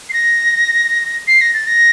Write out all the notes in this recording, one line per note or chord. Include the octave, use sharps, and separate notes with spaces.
C7
A#6
C7
A#6
A6
A#6